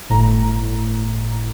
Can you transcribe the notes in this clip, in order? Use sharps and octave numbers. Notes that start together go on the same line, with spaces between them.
G1 A2 A#5